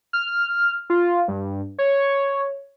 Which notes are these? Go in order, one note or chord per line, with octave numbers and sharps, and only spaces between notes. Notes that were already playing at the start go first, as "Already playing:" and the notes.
F6
F4
G2
C#5